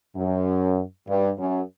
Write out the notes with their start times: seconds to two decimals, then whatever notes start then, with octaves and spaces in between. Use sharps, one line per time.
0.16 F#2
1.08 G2
1.39 F#2